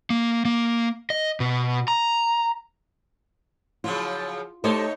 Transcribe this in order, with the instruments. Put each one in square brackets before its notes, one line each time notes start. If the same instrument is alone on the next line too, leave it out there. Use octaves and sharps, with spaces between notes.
[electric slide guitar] A#3
A#3
D#5
B2
A#5
[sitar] C#3 F3 F#3 [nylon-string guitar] F4
[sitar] A2 D#4 C#5 [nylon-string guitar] A3 G4 C5